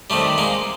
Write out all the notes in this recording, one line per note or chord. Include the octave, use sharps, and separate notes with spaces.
C3 D#3 G3 A3
G#3 A#3